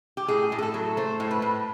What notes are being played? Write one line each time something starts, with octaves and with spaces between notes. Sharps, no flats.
G4
A2 G#4
A2
G#4
A4
F#3
A3 C5
A2
B4
A2